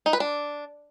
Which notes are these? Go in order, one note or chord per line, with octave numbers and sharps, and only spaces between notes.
D#4
B4
D4